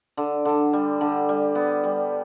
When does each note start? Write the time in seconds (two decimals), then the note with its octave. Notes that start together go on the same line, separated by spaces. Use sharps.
0.17 D3
0.45 D3
0.73 G3
1.01 D3
1.29 G3
1.55 B3
1.84 G3